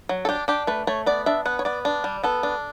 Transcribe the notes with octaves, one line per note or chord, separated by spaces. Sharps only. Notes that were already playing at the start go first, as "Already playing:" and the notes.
F#3
A4
D4 G4
D4 G4
A3 B4
A3 C#5
B3 D5
D4 E5
B3 F#5
C#5
B3 D5
D4
G3
B3 A4
D4